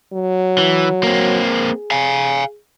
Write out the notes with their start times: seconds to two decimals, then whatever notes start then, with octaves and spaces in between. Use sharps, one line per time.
0.13 F#3
0.58 E3
1.03 A#3 C4
1.49 G#4
1.91 F5 G#5